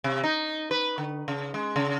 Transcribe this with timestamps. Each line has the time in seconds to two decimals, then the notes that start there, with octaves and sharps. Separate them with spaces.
0.04 C3
0.23 D#4
0.71 B4
0.98 D3
1.28 C#3
1.54 G#3
1.76 C#3